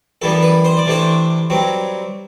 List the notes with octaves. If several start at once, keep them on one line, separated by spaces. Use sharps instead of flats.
F#2 E3 G3 B3 A4
B4
C5
D5
C3 E3 A3 D4 C5
G2 F#3 C4